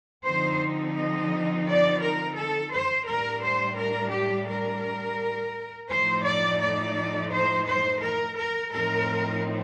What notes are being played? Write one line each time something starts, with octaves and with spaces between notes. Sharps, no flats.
D3 F3 C4 D#4 C5
D#5
D5
A#4
A4
C5
A2 G3 D4 A#4
C5
A#4
G4
A#4
A2 F3 A3 D#4 C5
D5
D5
C5
C5
A#4
A#4
A2 F3 C4 D#4 A#4